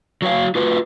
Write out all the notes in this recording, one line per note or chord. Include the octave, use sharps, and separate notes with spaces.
F#3 F#4 C#5 F5
F4 F#4 B4